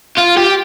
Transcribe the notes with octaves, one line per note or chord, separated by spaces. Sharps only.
F4
G4